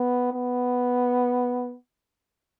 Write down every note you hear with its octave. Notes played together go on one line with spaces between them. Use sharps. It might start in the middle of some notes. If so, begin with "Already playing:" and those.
Already playing: B3
B3